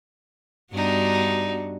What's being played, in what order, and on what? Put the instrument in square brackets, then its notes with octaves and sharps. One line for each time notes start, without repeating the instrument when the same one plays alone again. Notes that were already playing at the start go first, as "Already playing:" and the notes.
[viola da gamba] G2 B3 F#4 [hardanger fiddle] D4 D#4